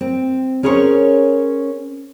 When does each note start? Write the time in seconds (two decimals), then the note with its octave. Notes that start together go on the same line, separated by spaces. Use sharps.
0.01 C4
0.63 C#4 G#4 A#4 C5 C#5